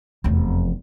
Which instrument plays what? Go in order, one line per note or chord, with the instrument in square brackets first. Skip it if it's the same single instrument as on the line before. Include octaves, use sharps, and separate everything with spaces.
[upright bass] F1 E2